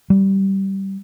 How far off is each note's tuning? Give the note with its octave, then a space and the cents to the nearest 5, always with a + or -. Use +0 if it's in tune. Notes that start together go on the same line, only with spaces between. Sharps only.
G3 -15